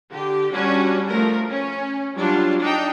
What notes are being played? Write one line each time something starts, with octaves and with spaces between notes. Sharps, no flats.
D3 G4
G3 C#4 D4 F#4
F3 A3 A#4
C#4
F#3 G3 D4 F4
D4 D#4 G5